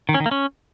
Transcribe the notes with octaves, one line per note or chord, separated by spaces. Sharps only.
D#3
C#4
D#3
A#3
C#4